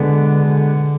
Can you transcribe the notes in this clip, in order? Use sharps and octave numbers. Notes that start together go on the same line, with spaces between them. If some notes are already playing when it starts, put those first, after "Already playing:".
Already playing: B2 D3 G#3 B3 D4
D3